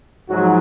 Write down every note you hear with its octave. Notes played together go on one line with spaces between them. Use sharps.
G#2 F3 F#3 F#4